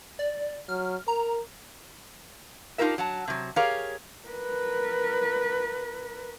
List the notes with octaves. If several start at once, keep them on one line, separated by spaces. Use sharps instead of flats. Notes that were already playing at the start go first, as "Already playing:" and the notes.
D5
F#3 F6
A#4 A#5
D4 D#4 F4 G4 A#4 E5
F#3 F#5 A5
C3 F#3
G4 G#4 A#4 C#5 F5
A#4 B4